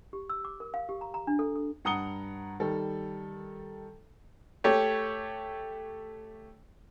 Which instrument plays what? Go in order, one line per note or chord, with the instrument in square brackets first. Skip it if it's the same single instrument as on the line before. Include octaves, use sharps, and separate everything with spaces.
[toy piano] G4
E6
D6
A#4
F5
G4
A#5
A#5
D4
A4
A4
[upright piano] G2 F#5 A#5 D#6 C#7 G7
D#3 G3 A4
[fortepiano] A3 G4 C#5